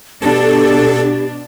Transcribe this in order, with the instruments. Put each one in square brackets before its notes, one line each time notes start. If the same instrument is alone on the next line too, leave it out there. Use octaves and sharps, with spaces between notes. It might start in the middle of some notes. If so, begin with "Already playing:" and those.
[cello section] B2 D4 [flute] G4 [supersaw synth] A4